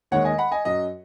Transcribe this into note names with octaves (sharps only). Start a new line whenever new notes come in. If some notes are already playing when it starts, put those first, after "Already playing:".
D#2 D#3 G#3 C#5 F#5
D#5 G#5
F#5 B5
D#5 G#5
F#2 F#3 D#5